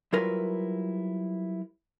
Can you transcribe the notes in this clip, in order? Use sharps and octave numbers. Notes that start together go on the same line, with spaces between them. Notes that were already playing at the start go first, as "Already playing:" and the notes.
F#3 G3 E4 F4 A#4 B4